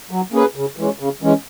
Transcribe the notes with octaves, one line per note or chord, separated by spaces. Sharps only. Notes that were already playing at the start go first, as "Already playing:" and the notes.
F#3
A#3 C#4 G#4 B4
C#3
E3 G#3 C#4
C#3
E3 G#3 C#4